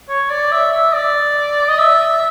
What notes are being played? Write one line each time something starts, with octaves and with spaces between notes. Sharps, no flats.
C#5
D5
E5
E5
D5
D#5
E5